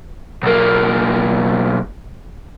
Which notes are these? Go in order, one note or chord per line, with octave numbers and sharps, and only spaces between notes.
B1 A#3